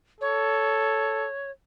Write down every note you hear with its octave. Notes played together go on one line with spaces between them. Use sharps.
A4 C#5